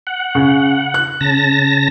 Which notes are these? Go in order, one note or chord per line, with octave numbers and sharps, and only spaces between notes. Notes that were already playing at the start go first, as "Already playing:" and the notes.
F#5
C#3
F#6
C#3 A5 A#6